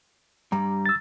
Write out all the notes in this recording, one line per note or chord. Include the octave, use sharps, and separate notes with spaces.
G2 G3 A#5
E6 A6